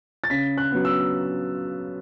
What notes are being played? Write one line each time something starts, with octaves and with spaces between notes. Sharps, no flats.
A6
C#3 B6
F#6
F#3 B3
E6